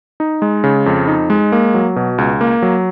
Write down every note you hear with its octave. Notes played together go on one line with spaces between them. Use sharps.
D#4
G#3
C#3
F2
D#4
G#3
A#3
F#3
B2
C#2
A#3
F#3